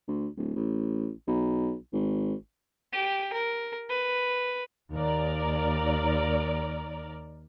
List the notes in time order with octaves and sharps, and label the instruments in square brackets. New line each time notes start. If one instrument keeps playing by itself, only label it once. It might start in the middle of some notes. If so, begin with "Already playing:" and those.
[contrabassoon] D2
D1
A1
B1
G#1
[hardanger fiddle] G4
A#4
B4
[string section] D#2 A#4 D5